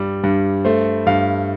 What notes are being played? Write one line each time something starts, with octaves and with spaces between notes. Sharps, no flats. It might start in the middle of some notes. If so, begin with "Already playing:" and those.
Already playing: G2 G3
G2
A3 C5
G2 F5